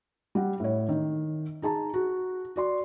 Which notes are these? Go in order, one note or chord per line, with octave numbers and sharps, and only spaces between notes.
G3 F#5
A2 C#5
D#3
D#4 G#4 A5 A#5
F#4
F#4 D5 C6